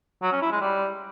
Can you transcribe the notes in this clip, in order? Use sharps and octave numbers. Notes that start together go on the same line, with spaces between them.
F#3
C#4
E4
G#3
G3